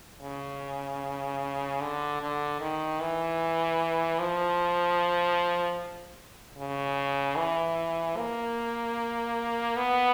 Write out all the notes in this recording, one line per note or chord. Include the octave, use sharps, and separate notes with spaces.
C#3
D3
D3
D#3
E3
F3
C#3
E3
A#3
B3